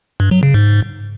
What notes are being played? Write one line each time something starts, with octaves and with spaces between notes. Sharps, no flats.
G2
F#3
C#3
G#2